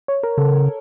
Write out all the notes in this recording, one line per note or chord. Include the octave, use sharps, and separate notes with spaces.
C#5
A#4
C#3 A4